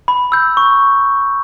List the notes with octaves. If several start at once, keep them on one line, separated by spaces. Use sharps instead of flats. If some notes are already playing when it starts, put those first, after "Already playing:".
B5
E6 G6
C#6